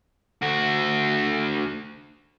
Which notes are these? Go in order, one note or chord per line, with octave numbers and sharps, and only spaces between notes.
D2 F#4